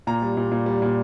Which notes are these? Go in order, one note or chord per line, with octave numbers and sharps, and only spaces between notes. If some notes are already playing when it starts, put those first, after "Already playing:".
A#2 A#5
G3
A#2
A#2
G3
A#2